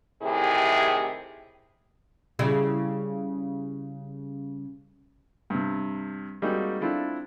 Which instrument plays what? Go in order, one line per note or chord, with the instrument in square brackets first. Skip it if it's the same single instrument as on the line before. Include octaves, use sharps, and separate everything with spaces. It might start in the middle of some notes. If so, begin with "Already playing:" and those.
[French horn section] A2 C3 D#3 E4 G4 G#4
[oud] C#3 G3 E4
[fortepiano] G2 C3
G3 G#3 A#3 C4 D#4 F#4
C4 D4 E4 F4 A4